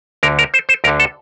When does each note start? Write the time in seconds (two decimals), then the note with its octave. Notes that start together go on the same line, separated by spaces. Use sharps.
0.23 D2 D3 A#4
0.39 A#4
0.54 C5
0.69 C5
0.84 D2 A#4
0.87 D3
1.00 A4